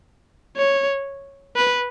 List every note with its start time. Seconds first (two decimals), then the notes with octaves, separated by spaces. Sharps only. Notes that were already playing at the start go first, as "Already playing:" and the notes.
0.57 C#5
1.56 B4